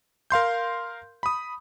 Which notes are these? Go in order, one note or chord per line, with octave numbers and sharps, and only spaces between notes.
A#4 F5 C6 G6
B5 D#6